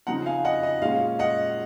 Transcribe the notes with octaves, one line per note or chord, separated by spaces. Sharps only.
C#3 F3 C4 D#4 F#5 A#5
F5 G#5
D#5 F#5
D#5
A#2 G#3 C#4 F5
D#5 F#5